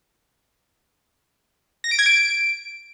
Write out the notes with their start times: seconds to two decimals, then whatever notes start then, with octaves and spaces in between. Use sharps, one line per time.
1.84 A#6
1.91 D7
1.99 G#6
2.06 D7